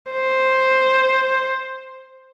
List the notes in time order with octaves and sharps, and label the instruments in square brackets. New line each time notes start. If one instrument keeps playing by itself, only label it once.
[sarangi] C5